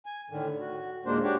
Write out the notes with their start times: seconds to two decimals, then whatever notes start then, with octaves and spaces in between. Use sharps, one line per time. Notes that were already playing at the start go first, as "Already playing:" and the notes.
0.06 G#5
0.30 A2 D3 D#3
0.60 F#4
1.06 D#2 A#2 G#3 A#3 D4 C5
1.23 D4 F#4 G4 C#5